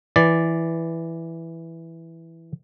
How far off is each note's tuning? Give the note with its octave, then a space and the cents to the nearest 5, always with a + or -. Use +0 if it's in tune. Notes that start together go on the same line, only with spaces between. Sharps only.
E3 +0 D5 +0